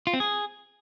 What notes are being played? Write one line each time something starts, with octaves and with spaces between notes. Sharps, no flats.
F4
C4
G#4